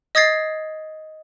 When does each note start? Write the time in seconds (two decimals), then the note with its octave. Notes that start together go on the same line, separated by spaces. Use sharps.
0.15 D#5 D#6 G#6 A6 C7